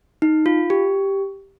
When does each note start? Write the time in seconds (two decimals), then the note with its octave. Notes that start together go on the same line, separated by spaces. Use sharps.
0.22 D#4
0.46 F4
0.70 G4